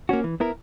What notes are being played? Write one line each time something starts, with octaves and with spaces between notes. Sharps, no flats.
A#3 C#4 F#4
E3
B3 E4 A#4